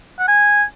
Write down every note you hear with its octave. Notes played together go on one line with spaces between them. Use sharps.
F#5
G#5